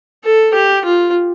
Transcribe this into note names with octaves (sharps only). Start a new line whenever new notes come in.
A4
G4
F4